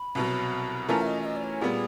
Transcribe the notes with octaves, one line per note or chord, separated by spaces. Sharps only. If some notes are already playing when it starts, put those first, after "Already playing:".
Already playing: B5
C2 B2 F#3
E3 A3 C#4 F4 A#4 A5
E5
D#5
E5
D#5
D5
C#5
A#2 G3 B3 G#4